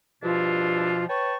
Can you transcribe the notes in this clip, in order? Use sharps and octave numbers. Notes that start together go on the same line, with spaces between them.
G2 B2 F3 D4 E4 F4
B4 C#5 G5 A5 C#6